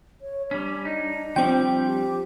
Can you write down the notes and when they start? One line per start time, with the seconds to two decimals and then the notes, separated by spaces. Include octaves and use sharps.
0.21 C#5
0.51 G3 C#4 D4
0.85 D#4
1.36 F3 G3 C4 G5
1.86 G4